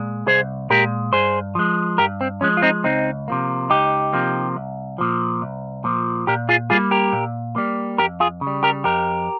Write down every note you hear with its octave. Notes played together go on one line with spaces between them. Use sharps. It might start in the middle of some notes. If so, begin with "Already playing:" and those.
Already playing: A#2 G#3
C2 G#4 C5
A#2 G#3 G4 A#4
G2 G#4 C5
F3 G#3
G2 G4 A#4
C4
F3 G#3 C#4
F4
C4 D#4
C#2 C4 D#4
C3 F3 A#3
C#2 D#4 G4
C3 F3 A#3
C2
A#2 F3
C2
A#2 F3
A#2 G4 A#4
F4 G#4
G3 A#3 F4 G#4
G4 A#4
A#2
G3 A#3
F2 G4 A#4
F4 G#4
C#3
G3
G4 A#4
F2 G4 A#4